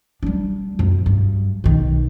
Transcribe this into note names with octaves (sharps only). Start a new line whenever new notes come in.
G3 D4
F#2 C3
G2
B1 D#3